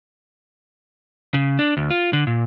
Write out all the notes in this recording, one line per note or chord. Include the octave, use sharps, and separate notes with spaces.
C#3
D4
D2
F4
D3
A#2